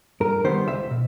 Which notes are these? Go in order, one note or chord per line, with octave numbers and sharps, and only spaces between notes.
G2 A#4
D#3 G3 B3 C5
C#2 E5
B2